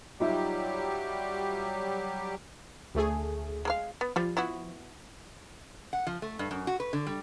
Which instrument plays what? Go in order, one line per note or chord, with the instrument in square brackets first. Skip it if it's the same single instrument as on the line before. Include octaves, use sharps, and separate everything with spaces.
[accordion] F#3 G3 G4 [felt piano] D#4 F4 E5
[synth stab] D2 A3 G#4
[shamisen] G#3 A#4 F5
B3
[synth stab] F3 [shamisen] G3 F4
[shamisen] B3 E4 F#4
[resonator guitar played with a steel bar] F#5
F3
A3
G2
F#2
F#4
B4
D3
G3